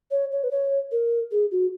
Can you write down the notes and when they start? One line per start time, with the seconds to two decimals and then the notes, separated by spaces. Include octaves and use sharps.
0.11 C#5
0.32 C#5
0.44 B4
0.51 C#5
0.92 A#4
1.32 G#4
1.51 F#4